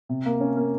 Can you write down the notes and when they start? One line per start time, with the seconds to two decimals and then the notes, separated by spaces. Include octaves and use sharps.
0.09 C3
0.26 A#3
0.40 C#4
0.57 A#3